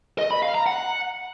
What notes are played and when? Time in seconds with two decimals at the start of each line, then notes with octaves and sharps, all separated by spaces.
0.19 D#5
0.31 B5
0.43 F5
0.54 A#5
0.66 F#5